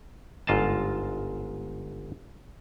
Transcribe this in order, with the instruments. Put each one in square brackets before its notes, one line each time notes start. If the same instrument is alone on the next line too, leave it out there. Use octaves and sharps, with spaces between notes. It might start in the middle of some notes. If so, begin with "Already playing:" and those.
[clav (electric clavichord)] G1 G#2 F4 D#5 A5